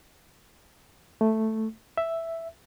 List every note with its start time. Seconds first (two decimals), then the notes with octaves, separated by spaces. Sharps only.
1.21 A3
1.98 E5